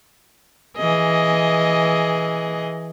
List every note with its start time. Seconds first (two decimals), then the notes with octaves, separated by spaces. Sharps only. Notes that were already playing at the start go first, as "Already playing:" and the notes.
0.77 E3 G#4 D#5